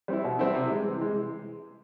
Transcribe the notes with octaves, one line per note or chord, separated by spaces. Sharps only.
G3 C4 E4
B2
G3 C4 E4
C3
E3 G#3
C3
E3 G#3